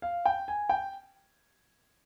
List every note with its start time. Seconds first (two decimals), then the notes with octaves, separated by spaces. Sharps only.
0.02 F5
0.25 G5
0.48 G#5
0.69 G5